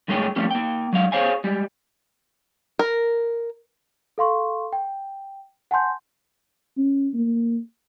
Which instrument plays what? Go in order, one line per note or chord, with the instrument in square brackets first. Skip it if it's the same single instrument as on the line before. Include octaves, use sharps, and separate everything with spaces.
[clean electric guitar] G2 G#3 A3 G#4 C#5 G5
F3 G3 A3 A#3 C#4 G4
A#3 G5
F#3 G#3 F5
G#4 A4 C5 C#5 F5 G#5
G3 G#3
[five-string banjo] A#4
[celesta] A4 F5 C6 C#6
G5
F#5 G#5 A5 C6 G6
[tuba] C#4
A#3